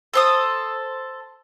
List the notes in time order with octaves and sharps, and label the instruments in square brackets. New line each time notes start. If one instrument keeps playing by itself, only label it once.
[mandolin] A4 C5 D#6